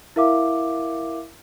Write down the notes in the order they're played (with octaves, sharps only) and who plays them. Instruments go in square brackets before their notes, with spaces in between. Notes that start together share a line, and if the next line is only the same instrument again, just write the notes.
[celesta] E4 A#4 E5 F5 D6